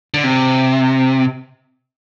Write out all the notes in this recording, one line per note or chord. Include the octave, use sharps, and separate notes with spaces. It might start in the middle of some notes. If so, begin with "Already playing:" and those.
D3
C3